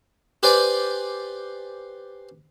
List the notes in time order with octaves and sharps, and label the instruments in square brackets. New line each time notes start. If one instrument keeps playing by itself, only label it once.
[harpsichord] G4 B4 C5 D5 G5 G#5